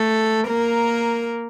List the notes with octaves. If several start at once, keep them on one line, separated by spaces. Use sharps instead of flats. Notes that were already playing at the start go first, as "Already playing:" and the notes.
Already playing: A3 A4
A#3 A#4